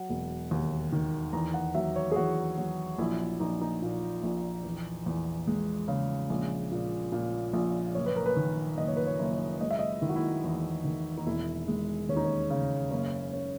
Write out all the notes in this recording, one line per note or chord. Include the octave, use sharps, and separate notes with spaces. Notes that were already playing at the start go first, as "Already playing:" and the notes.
Already playing: F#3 F#5
E1
D#2
D#3
E2 A#5
F#5
F#3 E5
C#5
G#4
E2 F#4
F#3
A#1 E4
E4
A#1 D#4
D#4
A#2
A#1
E2
E2
G#3
C#3
A#1
A#2
A#2
A#1
F#1 C#5
B4
A#4
B4
D#3
F#1 D#5
C#5
B4
C#5
F#1
G#3 D#5
E5
D#5
D#3 E4
F#4
E4
E2
D#3
D#4
E1 E4
G#3
D#2 C#4
D#4
C#4
C#3
F#1 C#4
C#4